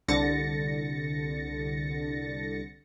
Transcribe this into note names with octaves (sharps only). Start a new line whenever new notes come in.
C2 D3 A6 A#6 C#7